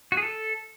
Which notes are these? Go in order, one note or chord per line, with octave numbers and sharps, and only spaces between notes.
F#4
G#4
A4